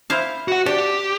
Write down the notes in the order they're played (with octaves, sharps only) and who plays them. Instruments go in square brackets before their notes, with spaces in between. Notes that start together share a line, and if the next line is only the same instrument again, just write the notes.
[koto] E4 C5 F5
[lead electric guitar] F#4 F#5
[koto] D4 [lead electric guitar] G4